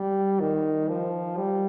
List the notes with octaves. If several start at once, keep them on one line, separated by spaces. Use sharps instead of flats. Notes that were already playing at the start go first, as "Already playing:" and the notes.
Already playing: G3
D#3
F3
G3